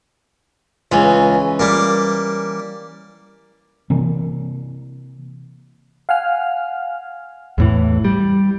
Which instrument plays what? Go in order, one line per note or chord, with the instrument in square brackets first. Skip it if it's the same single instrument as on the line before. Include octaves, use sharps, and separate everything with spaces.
[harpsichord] C#2 [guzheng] E3 C#4
[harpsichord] G3 A#3
[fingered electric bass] C3 E3 A#3
[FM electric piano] F5 F#5 G#5 F6
[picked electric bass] E2 A2 E3
G3